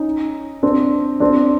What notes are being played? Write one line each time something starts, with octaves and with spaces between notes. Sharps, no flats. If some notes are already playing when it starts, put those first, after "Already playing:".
Already playing: C#4 D#4
C4 D4
C4 D4